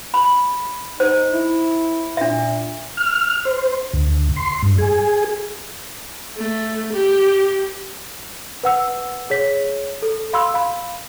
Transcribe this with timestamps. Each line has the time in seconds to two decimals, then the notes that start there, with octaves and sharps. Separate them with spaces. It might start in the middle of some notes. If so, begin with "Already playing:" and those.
0.14 B5
1.00 D#4 C5
1.32 E4
2.17 A#2 D4 E5
2.97 F6
3.45 C5
3.93 D2
4.36 C6
4.62 G2
4.78 G#4
6.37 A3
6.92 G4
8.63 B4 F#5 E6
9.30 G#4 C#5 B6
10.02 A4
10.33 F5 B5 C6 E6
10.54 F5 B5